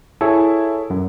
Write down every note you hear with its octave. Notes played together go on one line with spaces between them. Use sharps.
E4 G#4 A4 C#5
F#2